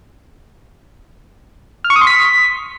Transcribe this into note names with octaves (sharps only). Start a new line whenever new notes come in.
F6
C#6
D#6
C6
B6